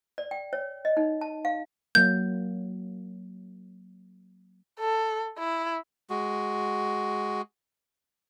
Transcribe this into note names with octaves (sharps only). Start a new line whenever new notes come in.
D5
G5
C#5
D#5
D#4
A5
F5
F#3 A#3 G6
A4
E4
G#3 F#4